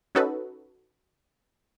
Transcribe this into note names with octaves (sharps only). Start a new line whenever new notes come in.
C#4 D#4 F#4 A4 B4